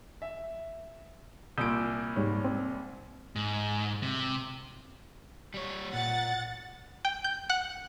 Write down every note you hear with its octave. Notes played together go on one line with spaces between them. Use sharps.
E5
C2 A#2 D#6 E6 G6 D7
G#2 G3 C#5
C4
G#2
C3
G3 C#5
A#2 F#5 A6
G5
G6
F#5